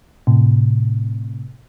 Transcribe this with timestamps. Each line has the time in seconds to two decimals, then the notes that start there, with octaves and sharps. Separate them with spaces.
0.27 A2 C3